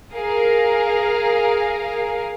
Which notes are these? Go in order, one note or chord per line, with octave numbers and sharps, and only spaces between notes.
G#4 A#4 F5